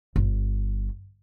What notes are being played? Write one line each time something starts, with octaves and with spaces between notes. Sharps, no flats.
G1